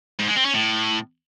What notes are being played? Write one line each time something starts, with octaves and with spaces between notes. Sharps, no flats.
G#2
G#3
C4
C#4
A2